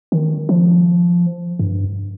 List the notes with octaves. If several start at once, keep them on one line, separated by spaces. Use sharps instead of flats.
D#3
F3
G2